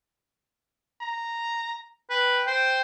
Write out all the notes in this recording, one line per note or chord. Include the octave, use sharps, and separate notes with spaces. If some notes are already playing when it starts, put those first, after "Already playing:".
A#5
B4 G5
C5 G5